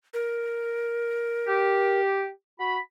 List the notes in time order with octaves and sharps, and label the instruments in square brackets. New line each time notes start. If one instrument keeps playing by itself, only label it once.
[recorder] A#4
[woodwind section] G4
F#4 B5